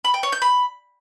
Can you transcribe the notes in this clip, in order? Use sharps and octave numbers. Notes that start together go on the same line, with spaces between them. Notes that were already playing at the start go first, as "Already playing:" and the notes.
B5
G5
C#5
G6
B5